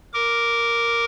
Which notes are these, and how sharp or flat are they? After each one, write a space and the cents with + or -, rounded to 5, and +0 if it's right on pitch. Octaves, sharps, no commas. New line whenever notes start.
A#4 +0 D6 +0